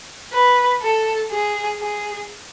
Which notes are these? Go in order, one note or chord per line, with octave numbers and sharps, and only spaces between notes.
B4
A4
G#4
G#4